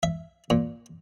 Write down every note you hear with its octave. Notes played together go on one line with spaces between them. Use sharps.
E5
A#2